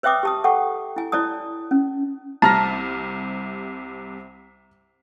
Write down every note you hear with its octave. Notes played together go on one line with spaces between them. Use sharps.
B4 C#5 E5 G5 D6 D#6
G4 A5 D#6
A4 F#5 G5 C#6
E4 G#5
E4 C#5 D5 A5 D#6
C#4
C2 C3 A5 A#5 F6 A#6